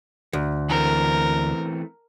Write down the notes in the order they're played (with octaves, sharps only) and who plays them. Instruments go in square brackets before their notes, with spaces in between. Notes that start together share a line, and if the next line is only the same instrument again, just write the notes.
[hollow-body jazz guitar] D2
[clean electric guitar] E3 A3 C4 [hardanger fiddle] A#4